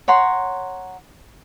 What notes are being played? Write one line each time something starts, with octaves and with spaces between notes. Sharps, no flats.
C#5 F#5 A#5 C6